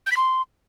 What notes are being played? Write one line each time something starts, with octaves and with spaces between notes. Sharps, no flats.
G6
B6
C6